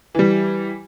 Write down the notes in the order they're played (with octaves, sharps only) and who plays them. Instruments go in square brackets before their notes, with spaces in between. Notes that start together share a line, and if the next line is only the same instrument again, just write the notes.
[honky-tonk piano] E3 G3